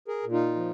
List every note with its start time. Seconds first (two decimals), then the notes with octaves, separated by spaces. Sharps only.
0.08 G#4 A#4
0.24 A#2
0.32 D#4 F4
0.55 F3